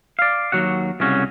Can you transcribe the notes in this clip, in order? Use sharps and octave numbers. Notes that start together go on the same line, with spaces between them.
D5 F5
D#2 F#3 F#4 F#5
C2 C#3 C#4 F#4